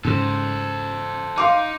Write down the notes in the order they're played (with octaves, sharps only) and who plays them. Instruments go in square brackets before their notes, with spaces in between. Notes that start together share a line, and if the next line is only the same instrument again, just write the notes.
[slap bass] G#2 C#3 [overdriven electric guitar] A4 C5
[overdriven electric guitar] D#4 [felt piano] F5 C6 D6